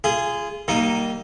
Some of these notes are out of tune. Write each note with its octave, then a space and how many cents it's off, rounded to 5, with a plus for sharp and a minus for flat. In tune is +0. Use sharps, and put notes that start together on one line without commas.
F4 -30 G#4 -5
G3 -30 A#3 -5 D#4 +0